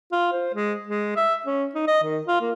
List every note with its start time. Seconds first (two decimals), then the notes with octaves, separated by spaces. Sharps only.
0.12 F4
0.32 C5
0.54 G#3
0.87 G#3
1.16 E5
1.46 C#4
1.75 D#4
1.87 D#5
2.03 D#3
2.27 F4
2.41 A#3